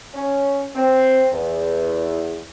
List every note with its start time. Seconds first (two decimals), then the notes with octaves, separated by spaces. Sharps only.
0.15 C#4
0.75 C4
1.31 E2